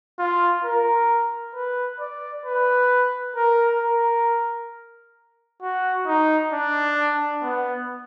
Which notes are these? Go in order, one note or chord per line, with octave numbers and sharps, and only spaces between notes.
F4
A#4
B4
D5
B4
A#4
A#4
F#4
D#4
D4
B3